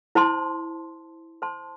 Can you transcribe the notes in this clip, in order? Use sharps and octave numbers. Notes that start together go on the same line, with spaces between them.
E4 C5 A5 C6
C5 A5 C6